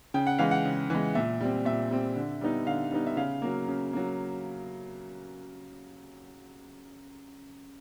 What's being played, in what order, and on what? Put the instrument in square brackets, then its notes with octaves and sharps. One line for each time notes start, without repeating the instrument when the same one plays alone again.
[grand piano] C#3 G5
F#5
E3 G#3 F5
F#5
C#3
E3 G#3
A#2 E5
G3 C4
A#2 E5
G3 C4
D3
G3 B3 D#4
D3 F5
G3 B3 D#4
E5
C#3 F5
F#3 A#3
C#3
F#3 A#3